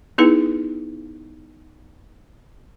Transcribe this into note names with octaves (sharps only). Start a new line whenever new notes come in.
B3 D#4 E4 G#4 B4